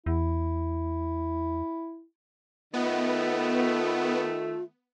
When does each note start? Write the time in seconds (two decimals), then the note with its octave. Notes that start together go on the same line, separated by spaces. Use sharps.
0.06 E2 E4
2.74 D#3 A3 B3 F4